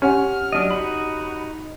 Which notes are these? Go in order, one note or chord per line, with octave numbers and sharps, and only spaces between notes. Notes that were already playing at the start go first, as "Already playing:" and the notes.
C#4 G4 C#5 F#5 F6
F#3 D4 D#5
D#4 F#4 B5